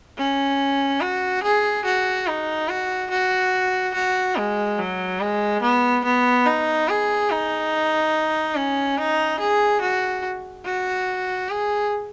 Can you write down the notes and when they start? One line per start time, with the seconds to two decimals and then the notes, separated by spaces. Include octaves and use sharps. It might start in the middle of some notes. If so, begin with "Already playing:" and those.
0.18 C#4
1.01 F#4
1.43 G#4
1.85 F#4
2.27 D#4
2.69 F#4
3.10 F#4
3.94 F#4
4.36 G#3
4.79 F#3
5.20 G#3
5.62 B3
6.04 B3
6.46 D#4
6.89 G#4
7.30 D#4
8.56 C#4
8.98 D#4
9.40 G#4
9.81 F#4
10.65 F#4
11.49 G#4